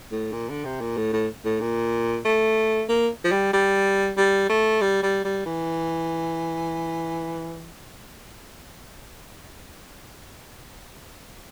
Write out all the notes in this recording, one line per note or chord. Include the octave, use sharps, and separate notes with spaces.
A2
A#2
D3
C3
A#2
A2
A2
A2
A#2
A3
A#3
F3
G3
G3
G3
A3
G3
G3
G3
E3